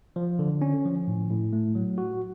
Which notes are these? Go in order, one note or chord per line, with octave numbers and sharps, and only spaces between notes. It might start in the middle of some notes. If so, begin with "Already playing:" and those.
F3
D3
C#4
F3
A2
A2
A3
F#3
F#4